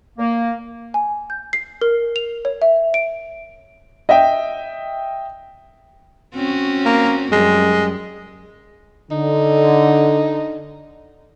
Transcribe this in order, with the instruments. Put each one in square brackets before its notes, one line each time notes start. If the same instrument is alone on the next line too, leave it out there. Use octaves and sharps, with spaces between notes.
[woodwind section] A#3
[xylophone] G#5
G6
C7
A#4
F7
C#5
E5
D7
[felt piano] D#5 E5 G5
[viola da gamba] C4 C#4 F#4
[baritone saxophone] A#3
[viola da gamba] F#2 G3 [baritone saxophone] G#3
[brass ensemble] D3 [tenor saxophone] D#4